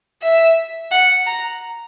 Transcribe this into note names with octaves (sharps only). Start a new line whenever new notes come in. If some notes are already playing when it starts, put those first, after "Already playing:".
E5
F#5
A#5